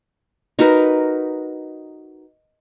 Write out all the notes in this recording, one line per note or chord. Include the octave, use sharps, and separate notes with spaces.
D#4 F#4 A#4 B4